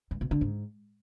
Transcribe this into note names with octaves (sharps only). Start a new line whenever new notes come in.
G2
B2
D3
G#2